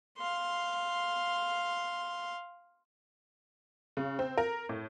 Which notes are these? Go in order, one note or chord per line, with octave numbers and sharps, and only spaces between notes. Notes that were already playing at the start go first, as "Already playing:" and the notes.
F5 C6
C#3
C4
A#4
A2